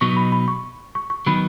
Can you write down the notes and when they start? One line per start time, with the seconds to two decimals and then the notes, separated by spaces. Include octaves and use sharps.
0.01 B2 F#3 B3 D#4 C#6
0.16 B5
0.32 B5
0.48 C#6
0.95 C#6
1.10 C#6
1.26 D#3 F#3 B3 D#4 B5